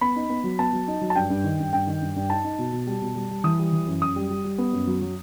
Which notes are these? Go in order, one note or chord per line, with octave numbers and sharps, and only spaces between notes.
B3 B5
D#4
B3
F#3
B3 A5
F#3
D#4
F#3
A5
G2 G5
G2
D#3
G2
G2 G5
D#3
G2
G2
D#4 A5
D#4
B2
B2
G3
B2
G3
G3
E3 D#6
G3
E3
F#2
F#2 D#6
G3
G3
G3
B3
F#2
F#3
F#3